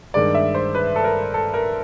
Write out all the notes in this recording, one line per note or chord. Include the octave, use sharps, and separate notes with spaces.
G2 D#3 G#3 D5
E5
C5
B4
A4
A#4
A4
A#4